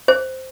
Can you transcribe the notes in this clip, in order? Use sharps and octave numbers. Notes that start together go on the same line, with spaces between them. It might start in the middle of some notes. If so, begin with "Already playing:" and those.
C5